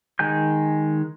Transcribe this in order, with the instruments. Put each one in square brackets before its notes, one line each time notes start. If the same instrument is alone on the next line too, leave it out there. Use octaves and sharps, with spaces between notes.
[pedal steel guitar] D#3 G#3 G#5 G6